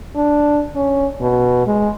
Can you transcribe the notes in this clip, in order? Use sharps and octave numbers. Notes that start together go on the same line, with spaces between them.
D4
C#4
B2
G#3